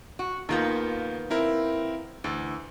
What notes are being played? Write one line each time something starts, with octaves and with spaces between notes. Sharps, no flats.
F#4
D#2 D#3 A#3 B3 F4 G6
C4 E4 A#4
D2 E3